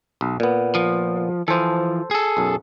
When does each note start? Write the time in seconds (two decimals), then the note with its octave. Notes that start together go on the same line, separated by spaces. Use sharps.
0.21 B1
0.40 A#2 B3
0.75 F3
1.48 E3 F3 A4 C5
2.11 G#4 A4
2.37 B1 F#2